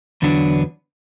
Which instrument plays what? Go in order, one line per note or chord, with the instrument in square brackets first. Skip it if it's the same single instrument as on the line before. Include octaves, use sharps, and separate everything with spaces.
[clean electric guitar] E2 D3 F#3 B3 D4